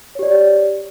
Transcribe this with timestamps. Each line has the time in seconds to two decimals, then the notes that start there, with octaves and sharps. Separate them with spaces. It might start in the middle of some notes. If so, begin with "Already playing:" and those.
0.15 C#5
0.19 G4
0.23 D5